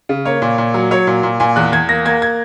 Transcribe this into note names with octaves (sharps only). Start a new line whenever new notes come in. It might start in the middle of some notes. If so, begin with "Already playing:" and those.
C#3
A#3 C#5
A#2
A#2
F#3
F#3 C#5
A#2
A#2
A#2 G#5
E2 F#6
E2 G#6
A#3 A#6
A#3 G#6
G#6